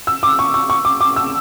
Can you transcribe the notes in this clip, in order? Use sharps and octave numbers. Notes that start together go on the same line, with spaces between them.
E6
D6
C#6
C#6
C#6
D6
D6
E6